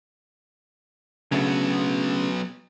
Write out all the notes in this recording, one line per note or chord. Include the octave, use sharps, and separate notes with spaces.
C#3 F#3 A3 B3 D4